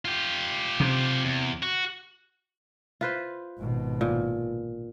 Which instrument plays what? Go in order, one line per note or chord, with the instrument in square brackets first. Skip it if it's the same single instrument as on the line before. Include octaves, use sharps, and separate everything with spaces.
[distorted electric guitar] F4 G4
[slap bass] C3
[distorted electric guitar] E2
F#4
[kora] F4 B4 C5
[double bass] G#1 B2
[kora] A#2